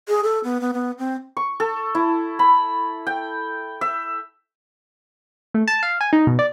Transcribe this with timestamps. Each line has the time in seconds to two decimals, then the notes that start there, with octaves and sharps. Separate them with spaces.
0.08 G#4
0.24 A4
0.44 B3
0.61 B3
0.74 B3
0.99 C4
1.37 C#6
1.60 A4
1.95 E4
2.39 B5
3.07 G5
3.81 E5
5.54 A3
5.68 A5
5.83 F5
6.01 G#5
6.13 D#4
6.27 B2
6.39 D5